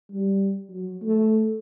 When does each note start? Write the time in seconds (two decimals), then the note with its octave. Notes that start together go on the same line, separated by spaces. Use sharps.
0.11 G3
0.70 F#3
1.02 A3